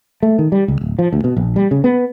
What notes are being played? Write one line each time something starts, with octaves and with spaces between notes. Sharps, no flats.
A3
D#3
G3
C#2
D1
F3
D2
B2
A#1
G3
C#3
B3